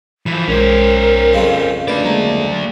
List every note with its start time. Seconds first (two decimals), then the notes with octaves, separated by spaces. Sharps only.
0.26 E3 F3 B5
0.48 B1 G#3 C#4 A#4 C5 G#6
1.34 F2 C#3 F3
1.88 A3 D4 B4 D5
2.05 F#3 G#3 A#3 A#5